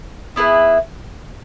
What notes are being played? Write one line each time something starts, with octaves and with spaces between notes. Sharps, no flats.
B3 E4 G#4 B4